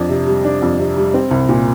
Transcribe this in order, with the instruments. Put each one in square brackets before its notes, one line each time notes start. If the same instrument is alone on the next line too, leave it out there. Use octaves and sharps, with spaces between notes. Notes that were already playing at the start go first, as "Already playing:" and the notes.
Already playing: [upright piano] F2 D4
C3
G3
D4
F2
C3
G3
C4
C2
A#2